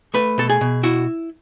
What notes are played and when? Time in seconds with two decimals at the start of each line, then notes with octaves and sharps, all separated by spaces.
0.14 A3 B4
0.38 B2 A4
0.50 G#4
0.61 B2
0.83 E4 F#4